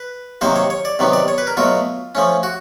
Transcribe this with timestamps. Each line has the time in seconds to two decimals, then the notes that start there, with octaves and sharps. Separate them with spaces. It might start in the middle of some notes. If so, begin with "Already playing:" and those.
Already playing: B4
0.41 C3 D#3 F#3 A#3 C5
0.56 C#5
0.70 C#5
0.85 D5
0.99 C3 D#3 F#3 B3
1.13 D5
1.28 C#5
1.38 B4
1.47 A#4
1.57 B2 F#3 A3 F4
2.15 F3 A3 C#4
2.43 F#4